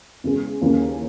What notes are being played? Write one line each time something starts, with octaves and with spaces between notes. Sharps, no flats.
E2 C#3 G#3
D#2 C#3 E3 A#3 C#4